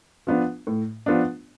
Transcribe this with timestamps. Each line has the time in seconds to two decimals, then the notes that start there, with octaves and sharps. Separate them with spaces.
0.27 F3 B3 D4
0.67 A2
1.06 F3 B3 D4